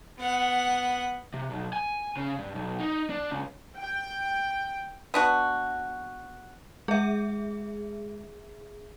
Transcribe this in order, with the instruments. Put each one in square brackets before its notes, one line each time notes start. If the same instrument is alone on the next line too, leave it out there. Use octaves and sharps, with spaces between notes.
[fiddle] B3 F#5
[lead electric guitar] C3
B1
G#5
C#3
G2
B1
D#4
D4
C#2
[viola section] G5
[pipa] B3 D4 F#4
[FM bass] G#3 [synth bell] G#4 E5